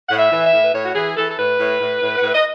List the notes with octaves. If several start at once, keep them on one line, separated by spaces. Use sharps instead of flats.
A2 F#5
E5
E3
E5
A2
B4
A2 C#5
F#4
E3 G#4
E3 A4
A4
A2 B4
A2
A2
A2
F#5
A2 E5
D#5